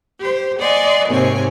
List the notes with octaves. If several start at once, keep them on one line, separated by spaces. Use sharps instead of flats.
G4 C5
D5 D#5 F#5 G#5 C6
D#2 G#2 C3 C4 C#5 G#5